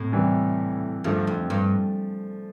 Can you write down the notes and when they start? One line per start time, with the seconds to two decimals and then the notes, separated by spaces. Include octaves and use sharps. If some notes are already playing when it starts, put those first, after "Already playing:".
Already playing: A2 C3
0.12 C3 E3 G3
1.04 G2 D3 F3 A3
1.27 F2
1.50 G2